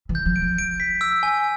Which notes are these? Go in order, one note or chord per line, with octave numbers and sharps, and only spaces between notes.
E3
G6
F3
D7
F3
D7
B6
E6
G#5